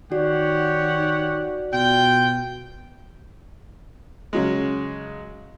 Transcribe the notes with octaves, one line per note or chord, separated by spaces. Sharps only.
D#3 F#4 G4 C#5 D5 F#5
B2 F4 G5
C#3 F#3 G#3